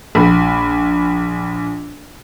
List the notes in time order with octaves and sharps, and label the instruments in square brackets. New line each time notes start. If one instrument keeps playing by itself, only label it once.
[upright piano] A#1 B5